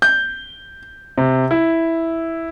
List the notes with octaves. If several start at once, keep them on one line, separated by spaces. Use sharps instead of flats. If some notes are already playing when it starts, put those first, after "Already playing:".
G6
C3
E4